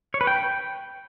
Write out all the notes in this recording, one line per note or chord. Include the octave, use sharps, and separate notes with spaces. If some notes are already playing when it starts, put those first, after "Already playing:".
C#5
B4
G5